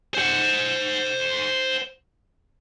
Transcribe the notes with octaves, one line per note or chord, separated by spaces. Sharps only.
C5 F#5